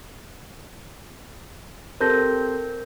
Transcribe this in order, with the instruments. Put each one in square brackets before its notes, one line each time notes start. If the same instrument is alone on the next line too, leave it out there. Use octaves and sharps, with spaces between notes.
[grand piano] C4 G4 A4 [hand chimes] A#4 G6 A#6